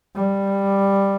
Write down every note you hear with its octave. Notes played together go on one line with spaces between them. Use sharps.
G3